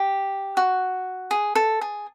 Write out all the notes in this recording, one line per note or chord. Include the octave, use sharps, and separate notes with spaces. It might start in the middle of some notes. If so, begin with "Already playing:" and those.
Already playing: G4
F#4
G#4
A4
G#4